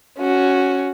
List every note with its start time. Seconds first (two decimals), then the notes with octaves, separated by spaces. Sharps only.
0.18 C#4 F#4